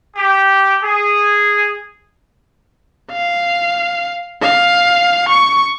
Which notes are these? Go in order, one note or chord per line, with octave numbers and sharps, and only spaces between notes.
G4
G#4
F5
F5
C#6